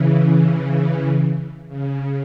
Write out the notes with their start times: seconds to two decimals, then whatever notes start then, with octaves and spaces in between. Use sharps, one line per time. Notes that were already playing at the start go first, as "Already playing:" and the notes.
Already playing: C#3 E3
1.69 C#3